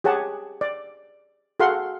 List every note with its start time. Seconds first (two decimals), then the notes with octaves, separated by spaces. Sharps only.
0.04 G4 G#4 C#5 F#5 A5
0.61 D5
1.60 F#4 G#4 A4 F5 F#5 C6